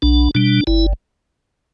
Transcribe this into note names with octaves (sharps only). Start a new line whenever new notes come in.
B1 D4
B2 G3 D4
G1 E4